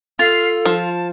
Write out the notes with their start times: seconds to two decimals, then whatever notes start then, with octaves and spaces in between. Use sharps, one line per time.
0.19 F4 A4 F5
0.65 F3 A5